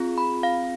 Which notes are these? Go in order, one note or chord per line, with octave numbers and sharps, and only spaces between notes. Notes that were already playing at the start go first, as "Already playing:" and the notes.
Already playing: C4 F4 G#4
B5
F5